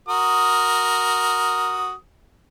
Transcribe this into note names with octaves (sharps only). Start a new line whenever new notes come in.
F#4 A#4 D#6